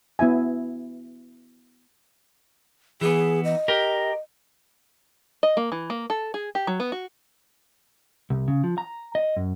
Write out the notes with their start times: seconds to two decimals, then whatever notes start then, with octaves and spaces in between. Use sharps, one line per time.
0.19 B3 E4 E5 G#5
3.01 E3 B3 G#4
3.45 D#5
3.68 G4 A#4
5.43 D#5
5.57 A#3
5.72 E3
5.90 A#3
6.10 A4
6.34 G#4
6.55 G4
6.67 F#3
6.80 B3
6.92 F#4
8.30 C2
8.48 C#3
8.64 F3
8.78 A#5
9.15 D#5
9.36 F#2